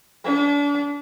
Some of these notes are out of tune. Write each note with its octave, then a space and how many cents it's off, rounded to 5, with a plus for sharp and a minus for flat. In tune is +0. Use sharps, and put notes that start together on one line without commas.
D4 -35